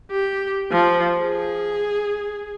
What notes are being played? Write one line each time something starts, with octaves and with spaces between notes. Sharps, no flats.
G4
F3
G#4